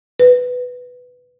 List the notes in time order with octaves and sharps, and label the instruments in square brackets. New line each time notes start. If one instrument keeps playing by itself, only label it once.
[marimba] B4